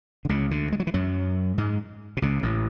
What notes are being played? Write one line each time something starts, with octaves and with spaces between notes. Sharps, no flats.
D3
C#2 C#3
D2 D3
G#3
F#3
E3
F#2 F#3
G#2 G#3
B2
C#2 C#3
A1 A2